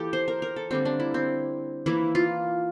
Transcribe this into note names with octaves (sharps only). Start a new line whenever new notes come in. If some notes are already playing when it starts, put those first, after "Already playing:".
Already playing: E3 A#3 G4 A4
C5
A#4
A#4
A4
D3 G3 A#3 C4
D4
E4
C4
E3 A#3 E4
F4